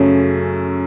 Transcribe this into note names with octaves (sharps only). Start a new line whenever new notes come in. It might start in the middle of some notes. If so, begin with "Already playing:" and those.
Already playing: F#2 C#3 A3 C#4